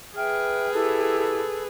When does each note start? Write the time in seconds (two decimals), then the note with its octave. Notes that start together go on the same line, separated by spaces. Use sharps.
0.16 G#4 B4 E5 G5 F6
0.74 E4 G4 A4